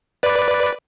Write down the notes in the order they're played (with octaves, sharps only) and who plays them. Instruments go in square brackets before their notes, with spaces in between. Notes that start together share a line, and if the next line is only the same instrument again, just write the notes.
[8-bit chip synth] B4 D5